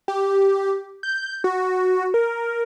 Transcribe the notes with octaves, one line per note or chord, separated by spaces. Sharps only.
G4
G6
F#4
A#4